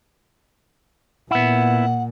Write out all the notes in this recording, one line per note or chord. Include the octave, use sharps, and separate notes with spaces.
A#2 B3 E4 F#5